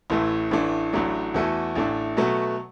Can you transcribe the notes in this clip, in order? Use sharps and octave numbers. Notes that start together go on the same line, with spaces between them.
A1 A2 E3 A3 E4
A1 A2 E3 A3 D4
A1 A2 F#3 A3 D4
E2 E3 A3 F#4 A4
A1 A2 A3 D4
B2 F#3 A3 F#4